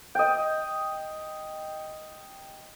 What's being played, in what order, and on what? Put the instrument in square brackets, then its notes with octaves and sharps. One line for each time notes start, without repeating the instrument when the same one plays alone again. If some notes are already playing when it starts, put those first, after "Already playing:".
[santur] D#5 G5